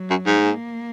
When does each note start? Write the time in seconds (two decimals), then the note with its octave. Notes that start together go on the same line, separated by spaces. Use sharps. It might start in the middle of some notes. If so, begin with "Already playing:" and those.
Already playing: F#3
0.10 F#2
0.26 G#2
0.43 A#3